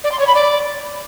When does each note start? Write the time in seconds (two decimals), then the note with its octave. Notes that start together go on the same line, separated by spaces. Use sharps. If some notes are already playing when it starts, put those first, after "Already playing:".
0.04 D5
0.11 C6
0.19 C#5
0.27 B5
0.34 D5